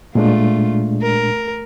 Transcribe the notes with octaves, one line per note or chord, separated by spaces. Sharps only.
A#2 G#3 A3 D4 F4
A#4